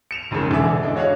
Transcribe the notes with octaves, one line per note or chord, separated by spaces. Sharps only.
C#7 E7 F7
A#1 F2 G#2 C#3 A#3
E1 D3 D4 G#4 E5
G#3 D4 E4
F#4 C#5 D#5 F5 F#5